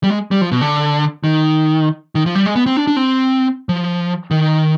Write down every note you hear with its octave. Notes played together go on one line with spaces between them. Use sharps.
G3
G#3
G3
F3
B2
D3
D#3
D#3
F3
G3
G#3
B3
C4
D4
D4
C4
F3
D#3